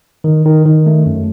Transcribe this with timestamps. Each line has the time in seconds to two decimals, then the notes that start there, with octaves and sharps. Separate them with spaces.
0.24 D#3
0.45 D#3
0.65 D#3
0.86 A3
1.06 F#2